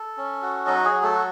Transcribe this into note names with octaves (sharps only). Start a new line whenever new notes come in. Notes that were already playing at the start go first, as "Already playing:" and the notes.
Already playing: A4
C#4
F#4
F#3 D#4 D#5
G#4
F#3
A3 A4
F#4